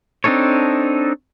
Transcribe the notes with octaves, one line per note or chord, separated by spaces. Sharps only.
C4 D4 D#4 A4 C#5